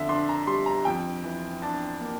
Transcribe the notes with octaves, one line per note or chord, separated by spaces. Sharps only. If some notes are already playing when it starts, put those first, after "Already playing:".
Already playing: F2 D3 E5
D4 C6
A#5
G3 C6
A#5
F2 G5
E3
D4 A5
A#3